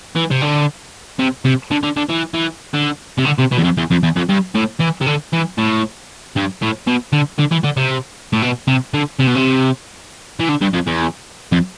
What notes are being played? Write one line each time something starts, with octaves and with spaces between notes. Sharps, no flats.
E3
C3
D3
C3
C3
D3
D3
D3
E3
E3
D3
C3
D3
C3
B2
E2
F2
E2
F2
E2
F2
G2
A2
E3
C3
D3
E3
A2
G2
A2
B2
D3
D3
E3
D3
C3
A2
B2
C3
D3
C3
B2
C3
E3
D3
G2
F2
E2
F2